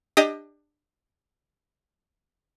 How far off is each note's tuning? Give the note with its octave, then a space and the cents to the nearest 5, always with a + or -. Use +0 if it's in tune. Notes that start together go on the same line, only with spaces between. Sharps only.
D4 +20 G4 +30 D#5 +15